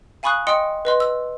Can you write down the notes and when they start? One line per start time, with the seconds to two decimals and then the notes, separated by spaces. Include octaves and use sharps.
0.23 F5 G#5 B5 C#6 D#6 F#6
0.47 D#5 G5 C6 D#6 C#7
0.85 B4 D#5 C6
1.00 E6